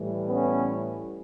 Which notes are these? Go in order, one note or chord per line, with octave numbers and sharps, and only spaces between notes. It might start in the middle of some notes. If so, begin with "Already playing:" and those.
Already playing: A2 E3 G3
B3 C#4